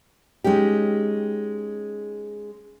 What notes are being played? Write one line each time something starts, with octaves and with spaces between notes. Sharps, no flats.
G#3 C#4 D#4 G4